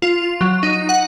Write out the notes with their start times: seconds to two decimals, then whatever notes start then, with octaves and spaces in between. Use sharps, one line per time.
0.02 F4
0.41 F#3
0.63 D#4
0.89 F#5